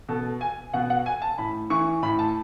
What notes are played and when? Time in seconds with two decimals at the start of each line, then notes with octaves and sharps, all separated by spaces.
0.09 B2 A4
0.41 G#5
0.73 B2 F#5
0.90 F#5
1.06 G#5
1.22 A5
1.38 A2 B5
1.70 E3 C#6
2.03 A2 B5
2.19 A5